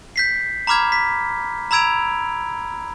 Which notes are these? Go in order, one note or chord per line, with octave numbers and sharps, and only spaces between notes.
G6 B6 C7
A#5 B5 D6 F6 G#6
B6
A#5 B5 E6 G#6 D7 F7